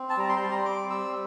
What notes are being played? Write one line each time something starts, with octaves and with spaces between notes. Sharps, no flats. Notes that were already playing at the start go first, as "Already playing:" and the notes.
Already playing: C4
A5
G3 A#5
C6
G5
G3 A5
A#5
C6
C4 D6
G3 E6